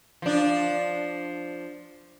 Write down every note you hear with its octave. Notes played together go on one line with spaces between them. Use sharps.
F3 D4